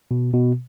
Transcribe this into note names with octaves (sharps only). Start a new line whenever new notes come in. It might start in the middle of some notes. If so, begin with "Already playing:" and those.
B2
B2